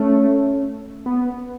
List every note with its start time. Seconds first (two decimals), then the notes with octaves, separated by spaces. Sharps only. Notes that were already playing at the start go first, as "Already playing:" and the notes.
Already playing: A3 C#4
1.06 B3